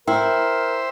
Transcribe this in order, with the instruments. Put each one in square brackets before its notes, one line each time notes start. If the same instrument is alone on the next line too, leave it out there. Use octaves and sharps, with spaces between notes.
[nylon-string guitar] E4 [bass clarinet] A#4 [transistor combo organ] C5 E5 [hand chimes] G5